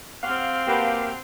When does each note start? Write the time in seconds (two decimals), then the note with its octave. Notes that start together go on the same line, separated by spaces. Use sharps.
0.23 C4 G4 C#5 F5 F#5 C6 F6
0.68 A#3 F#4 G4 B4 A5